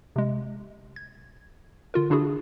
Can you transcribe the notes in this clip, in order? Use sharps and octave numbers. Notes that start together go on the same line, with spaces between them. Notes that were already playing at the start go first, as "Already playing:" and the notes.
C3 G#3
G#6
D3 F4 A#4
D3 D4 E4 F#4 G#4